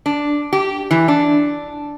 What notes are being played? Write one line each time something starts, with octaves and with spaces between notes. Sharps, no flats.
D4
G4
E3
D4